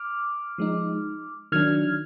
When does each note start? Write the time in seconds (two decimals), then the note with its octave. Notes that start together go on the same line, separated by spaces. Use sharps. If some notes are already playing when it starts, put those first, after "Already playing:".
Already playing: D6 F6
0.58 F3 G#3 D#4
1.52 D#3 F#3 D4 F6 G#6